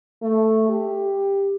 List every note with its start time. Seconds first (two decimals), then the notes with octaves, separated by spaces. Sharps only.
0.22 A3
0.69 G4